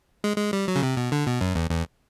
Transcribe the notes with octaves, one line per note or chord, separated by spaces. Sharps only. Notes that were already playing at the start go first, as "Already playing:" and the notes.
G#3
G#3
G3
F#3
C#3
C3
B2
D3
B2
F#2
E2
E2